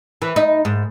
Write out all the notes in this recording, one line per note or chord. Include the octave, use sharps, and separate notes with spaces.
E3
D#4
G#2